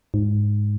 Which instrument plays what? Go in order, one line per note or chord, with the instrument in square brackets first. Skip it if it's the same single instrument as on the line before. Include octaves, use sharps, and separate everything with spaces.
[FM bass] G#2